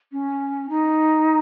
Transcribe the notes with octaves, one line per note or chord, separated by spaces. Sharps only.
C#4
D#4